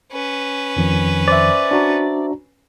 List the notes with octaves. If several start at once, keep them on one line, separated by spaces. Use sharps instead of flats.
C#4 B4
F2 D#3 F3
C5 D5 E5
D4 F#4 A#5